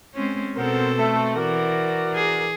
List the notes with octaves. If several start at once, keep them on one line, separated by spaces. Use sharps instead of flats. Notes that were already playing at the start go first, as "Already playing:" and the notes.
G#3 C4 C#4
B2 B3 C4 A4 A#4 C5
A3
E3 F#4 A#4 D5
G#4